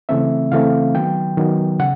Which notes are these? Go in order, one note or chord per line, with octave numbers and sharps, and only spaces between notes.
C#3 E3 A3 C4 E5
C#3 E3 A3 C4 F5
D#3 F#3 B3 G5
D#3 F#3 B3
C#3 F#5